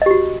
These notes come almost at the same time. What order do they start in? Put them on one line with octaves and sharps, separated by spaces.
D#5 G4 F#4